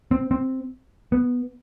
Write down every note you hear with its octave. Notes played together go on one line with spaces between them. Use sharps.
C4
C4
B3